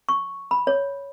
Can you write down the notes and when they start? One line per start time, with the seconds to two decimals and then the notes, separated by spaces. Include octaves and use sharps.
0.09 C#6
0.51 B5
0.67 C#5